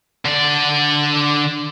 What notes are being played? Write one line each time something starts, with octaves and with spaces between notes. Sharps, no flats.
D3 D5